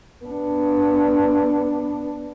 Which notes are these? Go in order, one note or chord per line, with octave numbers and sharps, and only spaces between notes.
B3 D4